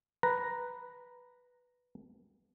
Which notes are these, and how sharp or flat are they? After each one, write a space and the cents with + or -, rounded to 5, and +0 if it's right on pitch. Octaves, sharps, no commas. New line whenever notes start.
B4 +0 A#5 +0